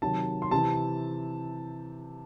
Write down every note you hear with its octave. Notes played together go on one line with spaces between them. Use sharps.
C3 D#3 F#3 A5
C6
C3 E3 C4 A5